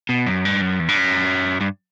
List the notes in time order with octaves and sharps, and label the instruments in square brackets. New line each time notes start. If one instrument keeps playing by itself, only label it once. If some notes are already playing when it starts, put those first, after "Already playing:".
[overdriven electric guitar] B2
F#2
G2
F#2
E2
G2
F#2
G2